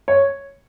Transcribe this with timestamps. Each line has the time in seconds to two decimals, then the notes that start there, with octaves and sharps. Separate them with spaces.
0.08 C#5